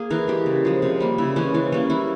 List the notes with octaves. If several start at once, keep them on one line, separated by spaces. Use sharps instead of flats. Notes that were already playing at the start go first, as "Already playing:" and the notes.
Already playing: A#3 G#4
E3 A#4
G#3 G4
C#3
F3 G#3
C3
G3 A#3
C#3 E4
E3 G#3 C#4
E3 C#4
G3 A#3 C#4
E3 E4